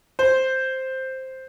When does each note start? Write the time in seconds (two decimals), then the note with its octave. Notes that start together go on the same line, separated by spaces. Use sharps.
0.19 C5